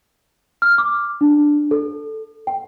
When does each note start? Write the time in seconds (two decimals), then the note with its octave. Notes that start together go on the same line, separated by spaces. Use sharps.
0.62 F6
0.78 D6
1.21 D4
1.71 A4
2.47 G5